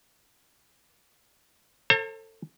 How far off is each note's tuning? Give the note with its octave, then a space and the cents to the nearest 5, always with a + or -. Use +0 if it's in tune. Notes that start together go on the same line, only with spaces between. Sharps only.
A4 +25 C5 +45 A#5 -45